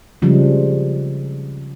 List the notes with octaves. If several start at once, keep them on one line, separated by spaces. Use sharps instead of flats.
C#3 F3 G3 G#3